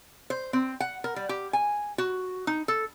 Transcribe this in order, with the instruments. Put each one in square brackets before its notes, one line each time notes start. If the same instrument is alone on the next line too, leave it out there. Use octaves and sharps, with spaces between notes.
[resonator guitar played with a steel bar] C5
C4
F#5
A#4
G3
G4
G#5
F#4
D#4
A4